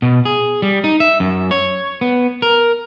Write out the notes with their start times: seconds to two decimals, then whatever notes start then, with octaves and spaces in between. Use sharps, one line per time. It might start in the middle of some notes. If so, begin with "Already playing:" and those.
0.02 B2
0.25 G#4
0.62 G3
0.84 D#4
1.00 E5
1.20 F#2
1.51 C#5
2.01 B3
2.42 A#4